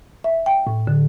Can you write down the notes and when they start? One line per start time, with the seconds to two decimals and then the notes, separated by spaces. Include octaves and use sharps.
0.24 E5
0.46 G5
0.67 A2
0.87 D3